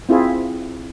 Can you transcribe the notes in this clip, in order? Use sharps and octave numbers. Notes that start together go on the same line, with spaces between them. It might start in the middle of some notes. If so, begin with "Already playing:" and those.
C4 E4 F4 G#4